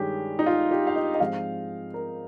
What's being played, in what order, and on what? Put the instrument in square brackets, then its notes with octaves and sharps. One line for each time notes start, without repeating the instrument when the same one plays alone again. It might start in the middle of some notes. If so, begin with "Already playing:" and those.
Already playing: [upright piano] G2 D#3 G#3 C#4 G4
D#4
F4
G4
F5
D#5
D#5
G#2 F3 G#3 C4 F5
A#4